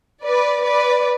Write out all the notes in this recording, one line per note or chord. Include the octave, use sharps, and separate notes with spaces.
B4 D5
B4 D5